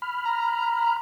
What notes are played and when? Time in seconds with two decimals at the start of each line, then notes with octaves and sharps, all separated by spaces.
0.02 B5 F6
0.25 A#5